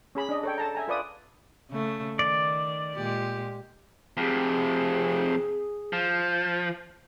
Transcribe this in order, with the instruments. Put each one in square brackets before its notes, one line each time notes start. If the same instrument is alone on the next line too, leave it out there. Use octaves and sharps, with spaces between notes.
[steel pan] C#4 G#4 B5
D4 D#5
A4 C#5 G5
A4 A5 A#5
E5 G#5 A#5
F4 B4 D5 D#6
[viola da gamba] C#3 A3
[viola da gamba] D#3 [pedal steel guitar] D5
[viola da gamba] A#2 G#3 G4
[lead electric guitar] F2 C3 [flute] G#4
[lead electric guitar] F3